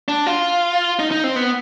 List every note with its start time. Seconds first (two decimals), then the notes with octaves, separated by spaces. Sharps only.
0.08 D4
0.26 F4
0.99 D#4
1.11 D#4
1.24 C4
1.36 B3